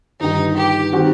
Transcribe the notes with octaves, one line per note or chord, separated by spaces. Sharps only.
G1 G2 D#3 D#4
G4
D#3 G3 C4 F#4